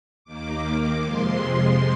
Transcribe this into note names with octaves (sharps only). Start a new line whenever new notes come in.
D#2 D#3 A#3 D6
F2 C3 F3 G#3 C6